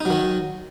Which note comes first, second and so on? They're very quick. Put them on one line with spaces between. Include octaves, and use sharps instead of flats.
D#4 F#3 D#3